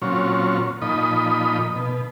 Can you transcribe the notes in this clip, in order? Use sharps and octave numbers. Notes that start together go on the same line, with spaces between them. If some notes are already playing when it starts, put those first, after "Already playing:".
A#2 F#3 C4 C#4 F4 C#5
A#2 F3 D#4 D#5 B5
B2